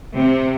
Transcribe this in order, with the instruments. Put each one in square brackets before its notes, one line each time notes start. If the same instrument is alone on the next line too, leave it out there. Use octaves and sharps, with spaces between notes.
[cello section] C3